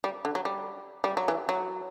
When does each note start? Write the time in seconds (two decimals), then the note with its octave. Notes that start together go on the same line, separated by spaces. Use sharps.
0.04 G3
0.25 D3
0.35 F#3
0.45 G3
1.04 G3
1.17 F#3
1.28 E3
1.49 F#3